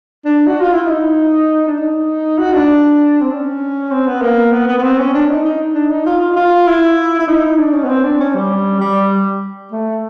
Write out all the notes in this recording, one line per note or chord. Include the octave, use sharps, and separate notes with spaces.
D4
F#4
F4
E4
D#4
D4
D#4
F#4
D4
C4
C#4
C4
B3
A#3
B3
B3
B3
C4
C#4
D4
D#4
D#4
D4
D#4
F4
F4
F4
E4
E4
D#4
D4
C#4
B3
C4
D4
C#4
G3
G3
A3